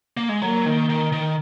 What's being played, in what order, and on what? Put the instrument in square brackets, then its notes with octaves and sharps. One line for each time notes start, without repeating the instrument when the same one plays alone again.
[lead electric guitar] A#3
G#3
[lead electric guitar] F#3 [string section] A#3
[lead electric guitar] D#3
D#3
D#3